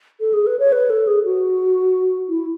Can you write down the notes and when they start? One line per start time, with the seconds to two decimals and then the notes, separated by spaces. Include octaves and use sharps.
0.20 A4
0.33 G#4
0.47 B4
0.59 C#5
0.72 B4
0.90 A4
1.07 G#4
1.24 F#4
2.29 E4